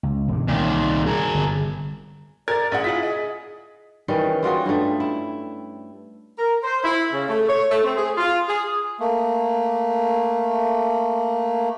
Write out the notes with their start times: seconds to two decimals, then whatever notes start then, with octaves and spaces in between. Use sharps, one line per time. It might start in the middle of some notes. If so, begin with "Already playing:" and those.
0.03 C#2
0.28 E1 G2
0.48 C2 A#2 D#3
1.07 G#4 A#4
1.35 G1 C3
2.48 A#4 D5 G#6 A6
2.72 A#1 D4 G#4 F#5
2.84 E4 F4 F#5 B6
3.03 G#4 D#5
4.08 D#3 E3 G3 C#4
4.42 G3 F4 F#4 G#4
4.66 G2 G3 A3
5.00 E4
6.38 A#4
6.63 C5
6.84 E4
7.13 C#3
7.28 A3
7.48 C#5
7.71 A3
7.84 C4
7.97 G#4
8.17 F4
8.48 G#4
8.99 A3 A#3